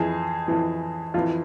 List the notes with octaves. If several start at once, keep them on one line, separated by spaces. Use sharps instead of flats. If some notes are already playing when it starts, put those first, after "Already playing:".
Already playing: F2 E3 G#4
F2 E3
F2 E3 F4